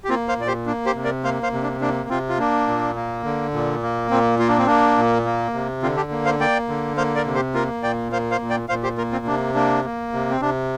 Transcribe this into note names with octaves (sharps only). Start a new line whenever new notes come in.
G4
A#3 C4 F4
C5 F5
A#2 D5
G4 C5
A#3 D4
G4 C5
C3
A#4 D5
A#3 C5 F5
C5 F5
C3
D4
A#3 D4
C3 C4 F4
F4
A#3 D4
A#2
A#3
D3
A#2
A#3
A#2 C4
A#3 F4
D4
C4
A#3 D4
A#2
A#3
C3
D3 C4 F4
D4 G4
A#3
C5 F5
A#3 D5 G5
D3
A#3 C5 F5
A#4 D5
C3
G4 C5
A#3 F4 A#4
A#2 D5 G5
A#3 C5 F5
C5 F5
A#2
D5 G5
A#2 C5 F5
G4 C5
A#3 F4 A#4
C4 F4
C3 D4
A#3 D4
A#3
C3
C4
C3 D4